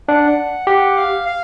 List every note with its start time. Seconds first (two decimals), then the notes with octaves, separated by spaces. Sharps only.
0.08 D4 F#5
0.67 G4 F#5
0.97 F5
1.27 F5